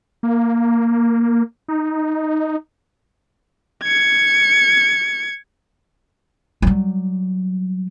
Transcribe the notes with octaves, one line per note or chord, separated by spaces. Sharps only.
A#3
D#4
G#6 C#7
F#3 G3